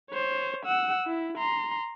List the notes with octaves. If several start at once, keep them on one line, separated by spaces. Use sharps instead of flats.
C5 C#5
F#5 E6
E4
A#5 C6